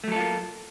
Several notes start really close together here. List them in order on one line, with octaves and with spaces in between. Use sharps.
A3 F#3 A4 F4 A#3